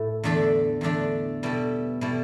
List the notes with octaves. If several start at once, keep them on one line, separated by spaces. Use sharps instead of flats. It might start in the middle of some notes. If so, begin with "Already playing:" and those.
Already playing: A2 E4 A4
E2 D3 A3 D4 A4
E2 D3 A3 D4 A4
B2 G3 E4 A4
B2 G3 E4 A4